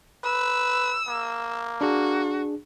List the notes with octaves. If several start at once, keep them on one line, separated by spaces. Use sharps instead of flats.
B4 E6
A#3
D4 F#4 G#4